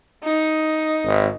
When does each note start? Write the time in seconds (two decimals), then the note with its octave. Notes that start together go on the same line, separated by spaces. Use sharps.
0.23 D#4
1.06 G#1